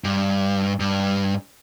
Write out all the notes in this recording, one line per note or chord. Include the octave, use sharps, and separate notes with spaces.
G2
G2